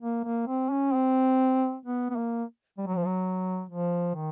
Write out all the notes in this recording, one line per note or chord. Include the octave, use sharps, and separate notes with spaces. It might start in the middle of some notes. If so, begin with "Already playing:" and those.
A#3
A#3
C4
C#4
C4
B3
B3
A#3
G3
F#3
F3
F#3
F3
D#3